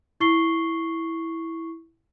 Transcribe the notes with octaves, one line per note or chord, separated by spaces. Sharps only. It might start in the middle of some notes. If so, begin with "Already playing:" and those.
E4 C#6 C7 G7